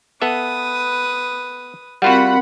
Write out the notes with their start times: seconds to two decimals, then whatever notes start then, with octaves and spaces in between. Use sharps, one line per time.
0.22 B3 A4 B4 E5 D#6
2.02 G3 C4 F4 F#4 A#4 F#5 B5